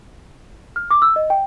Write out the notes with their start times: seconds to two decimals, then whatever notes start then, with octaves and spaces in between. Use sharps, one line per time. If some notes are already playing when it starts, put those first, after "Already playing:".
0.76 F6
0.91 D6
1.02 E6
1.16 D#5
1.30 G5